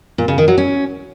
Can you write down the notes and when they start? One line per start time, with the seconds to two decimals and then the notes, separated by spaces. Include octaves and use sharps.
0.18 A#2
0.28 C#3
0.38 D#3
0.48 F#3
0.58 C#4